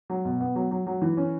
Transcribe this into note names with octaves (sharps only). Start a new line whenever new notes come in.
F#3
B2
B3
F#3
F#3
F#3
E3
C#4